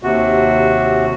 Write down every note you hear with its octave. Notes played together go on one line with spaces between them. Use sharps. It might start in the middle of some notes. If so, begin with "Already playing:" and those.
D#2 C3 F#4